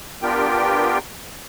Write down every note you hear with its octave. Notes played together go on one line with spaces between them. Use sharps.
B3 D4 F4 G4 A#4 G5